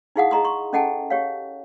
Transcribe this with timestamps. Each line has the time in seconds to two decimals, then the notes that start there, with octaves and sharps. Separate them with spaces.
0.16 D#4 E4 G#4 F5 F#5 D#6
0.31 G#4 D#5 A#5 C6 D#6
0.45 C6 C#6
0.73 C#4 A4 D#5 F#5 G5 A5
1.10 G4 C#5 F5